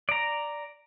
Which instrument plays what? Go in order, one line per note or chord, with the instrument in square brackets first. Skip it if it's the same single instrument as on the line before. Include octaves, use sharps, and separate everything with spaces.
[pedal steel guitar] D5 A#5